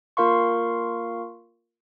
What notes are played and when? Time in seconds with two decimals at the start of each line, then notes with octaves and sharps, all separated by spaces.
0.17 A#3 F4 A#4 F5 C6 C#6